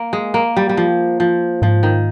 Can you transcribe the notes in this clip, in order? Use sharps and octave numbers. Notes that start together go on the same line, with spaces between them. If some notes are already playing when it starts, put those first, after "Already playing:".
Already playing: A#3
G#3
A#3
G3
G3
F3
F3
G#2 F3
D#3